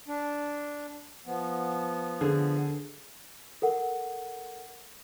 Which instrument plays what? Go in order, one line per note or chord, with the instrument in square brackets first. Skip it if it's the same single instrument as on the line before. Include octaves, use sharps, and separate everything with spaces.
[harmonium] D4
F3 B3
[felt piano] D3 G#4
[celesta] A4 A#4 F#5